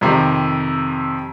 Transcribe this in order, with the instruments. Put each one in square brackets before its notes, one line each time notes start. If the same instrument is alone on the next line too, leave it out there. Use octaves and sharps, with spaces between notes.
[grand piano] F2 C3 D#3